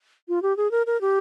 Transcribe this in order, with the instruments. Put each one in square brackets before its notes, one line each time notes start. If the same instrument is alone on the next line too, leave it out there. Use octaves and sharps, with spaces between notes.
[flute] F4
G4
G#4
A#4
A#4
G4